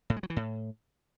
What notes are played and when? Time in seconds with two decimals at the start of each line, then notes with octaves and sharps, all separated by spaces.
0.10 A2
0.16 G#3
0.23 F#3
0.30 E3
0.37 A2